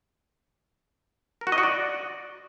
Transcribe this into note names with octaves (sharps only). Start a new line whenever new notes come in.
A#4
F#4
D#5
F#4
D5